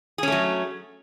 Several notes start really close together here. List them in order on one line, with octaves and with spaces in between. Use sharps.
G#4 C#4 A3 F#3